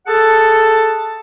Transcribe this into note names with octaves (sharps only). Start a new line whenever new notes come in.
G#4 A4 F#5 A5